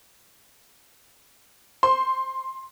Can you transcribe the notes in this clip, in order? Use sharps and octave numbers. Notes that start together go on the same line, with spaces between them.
C5 C6